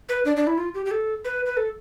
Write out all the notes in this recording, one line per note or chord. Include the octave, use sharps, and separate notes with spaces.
B4
D4
D4
E4
F4
G4
G4
A4
B4
B4
A4